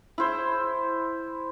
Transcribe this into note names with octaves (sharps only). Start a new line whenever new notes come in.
E4 C5